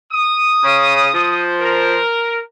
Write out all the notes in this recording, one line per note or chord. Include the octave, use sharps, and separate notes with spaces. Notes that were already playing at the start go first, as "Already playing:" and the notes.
D#6
C#3
F3 C5
A#4